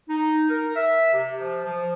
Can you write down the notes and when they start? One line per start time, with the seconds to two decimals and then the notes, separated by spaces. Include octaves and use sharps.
0.08 D#4
0.49 A#4
0.75 E5
1.13 C3
1.40 F3
1.65 F3